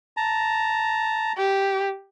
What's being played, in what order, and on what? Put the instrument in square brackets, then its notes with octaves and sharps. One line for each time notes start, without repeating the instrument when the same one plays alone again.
[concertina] A5 A#5
[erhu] G4